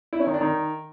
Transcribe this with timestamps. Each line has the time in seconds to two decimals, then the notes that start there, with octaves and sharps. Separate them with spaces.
0.13 E4
0.20 C#4
0.27 D#3
0.34 D4
0.41 D#3